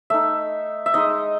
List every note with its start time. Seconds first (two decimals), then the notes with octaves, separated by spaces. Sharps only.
0.10 A3 D#4 E5
0.86 E5
0.94 G#3 D#4 D#5